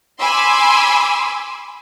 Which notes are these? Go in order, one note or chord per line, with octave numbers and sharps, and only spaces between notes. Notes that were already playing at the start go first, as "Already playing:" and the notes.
G#5 B5 C6 D6 E6